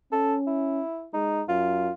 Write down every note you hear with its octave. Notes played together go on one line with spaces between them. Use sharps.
C#4 A4
E4
G#3 D#4
F#2 F4